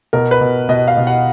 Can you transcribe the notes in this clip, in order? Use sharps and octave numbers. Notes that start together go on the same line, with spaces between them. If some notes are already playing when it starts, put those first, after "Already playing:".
B2 A#4
B4
B2
B2 D#5
F5
B2
F#5